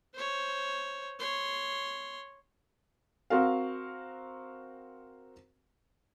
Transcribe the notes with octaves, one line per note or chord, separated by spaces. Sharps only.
C5 C#5
C#5 C6
C4 F#4 A#4 F5